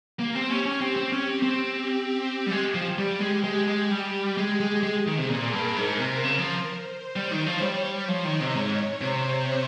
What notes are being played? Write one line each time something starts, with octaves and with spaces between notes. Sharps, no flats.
A#3 G4
C4
C#4
C#4
C4
C4
C#4
C4
C4
G4
G3
G#3 G4
F3
G3
G#3
G#3
G#3
G3
G#3 G#4
G#3
G#3
D#3
C3
A#2 A#4
G2
G#2
C3
C#3 A#4
F3
C5
G3 C#5
D#3
F3
G3
F3 D#5
D#3
C3
G#2 C#5
C3 C5